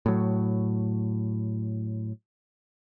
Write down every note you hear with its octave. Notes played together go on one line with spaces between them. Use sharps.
A2 F#3